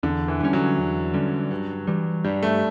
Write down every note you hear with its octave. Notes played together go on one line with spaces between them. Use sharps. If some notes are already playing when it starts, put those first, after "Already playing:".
E2 D3
E3
D3 G3 C#4
F#3
E2
D3 G3 C#4
G2
E3 G3
G2 G3
A3